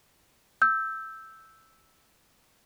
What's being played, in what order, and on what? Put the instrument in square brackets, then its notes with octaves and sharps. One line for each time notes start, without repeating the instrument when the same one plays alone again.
[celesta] E6 G6